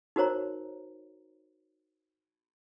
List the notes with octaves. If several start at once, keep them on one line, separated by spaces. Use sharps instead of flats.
D#4 F#4 A#4 C5 C#5 A#5